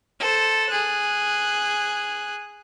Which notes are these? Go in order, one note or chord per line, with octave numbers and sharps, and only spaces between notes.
A4 C5
G#4 F#6